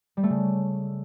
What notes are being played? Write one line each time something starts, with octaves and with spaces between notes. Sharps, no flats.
G3
A3
C#3